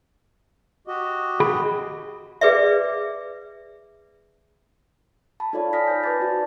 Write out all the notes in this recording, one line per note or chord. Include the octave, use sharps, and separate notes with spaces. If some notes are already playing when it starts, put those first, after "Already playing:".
F#4 G4 D#5
G#4 B5
G#4 B4 D5 E5
A5 B5
D#4 F4 A4 C#5 D5 F5
G#5 B5 D#6 F6 A#6 B6
C5 A5 G6
B4 D6 A6
D#4 F#4 D5